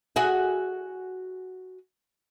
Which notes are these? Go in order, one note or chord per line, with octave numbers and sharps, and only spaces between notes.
F#4 G#4 E5